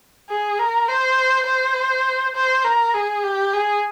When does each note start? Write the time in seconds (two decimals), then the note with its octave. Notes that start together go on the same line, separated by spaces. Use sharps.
0.29 G#4
0.59 A#4
0.88 C5
1.47 C5
2.35 C5
2.64 A#4
2.94 G#4
3.24 G4
3.53 G#4